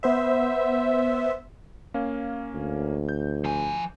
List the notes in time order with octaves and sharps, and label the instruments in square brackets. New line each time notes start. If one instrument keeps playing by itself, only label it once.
[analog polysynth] B3 C5 E5
[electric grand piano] A#3 C#4 F5
[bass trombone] D2
[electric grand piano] G6
[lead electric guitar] F3 G#5